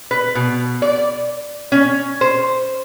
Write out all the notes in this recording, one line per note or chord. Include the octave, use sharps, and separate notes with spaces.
B4
B2
D5
C#4
C5